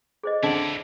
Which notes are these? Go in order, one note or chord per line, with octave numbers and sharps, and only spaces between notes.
G#4 C5 D#5
D3 C4 E4 G#4 D5 A5